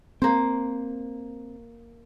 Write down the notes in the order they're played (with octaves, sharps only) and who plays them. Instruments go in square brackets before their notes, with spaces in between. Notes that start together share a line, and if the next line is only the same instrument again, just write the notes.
[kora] A#3 C5 [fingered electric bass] C4